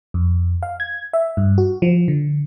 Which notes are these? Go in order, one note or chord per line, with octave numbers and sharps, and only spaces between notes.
F2
F5
G#6
E5
G2
F#4
F3
D3